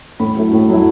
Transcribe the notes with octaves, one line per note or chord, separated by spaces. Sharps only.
A2 B5
F#3 A3 E4
A2
F#3 A3 E4